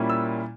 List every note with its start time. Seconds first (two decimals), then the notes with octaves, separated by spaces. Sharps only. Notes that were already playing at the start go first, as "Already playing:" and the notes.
Already playing: A#2 G3 A#3 C#4 E4
0.10 E6